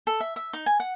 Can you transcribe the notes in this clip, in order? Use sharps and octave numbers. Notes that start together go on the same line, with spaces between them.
A4
E5
E5
D#4
G#5
F#5